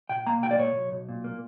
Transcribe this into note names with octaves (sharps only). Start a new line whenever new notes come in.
A#2 G5
A#3 A#5
B1 G5
D5
A#2 C#5
B1
B1
A#2
A#3